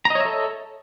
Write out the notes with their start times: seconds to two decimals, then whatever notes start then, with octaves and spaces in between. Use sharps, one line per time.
0.05 A#5
0.10 D#5
0.15 C#5
0.20 E5
0.25 A4